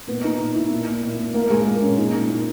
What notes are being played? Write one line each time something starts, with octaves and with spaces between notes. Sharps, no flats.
A#2 B3
A#2 D#4
A#2
A#2 E4
A#2
A#2
A#2
A#2
A#2 A#3
A#2 G#3
A#2 A#3
A#2 C#4
A#2 D#4
A#2
A#2 E4